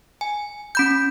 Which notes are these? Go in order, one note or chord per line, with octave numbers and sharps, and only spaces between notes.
G#5
C#4 B5 G6